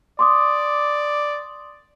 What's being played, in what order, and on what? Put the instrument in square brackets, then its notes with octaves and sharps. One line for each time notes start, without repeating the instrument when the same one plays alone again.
[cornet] D5 [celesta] C6 D6 D#6